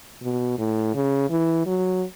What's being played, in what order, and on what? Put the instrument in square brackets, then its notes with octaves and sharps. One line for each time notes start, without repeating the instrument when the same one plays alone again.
[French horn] B2
A2
C#3
E3
F#3